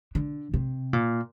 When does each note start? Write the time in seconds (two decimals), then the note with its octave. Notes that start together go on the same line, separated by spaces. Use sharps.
0.15 D3
0.54 C3
0.93 A#2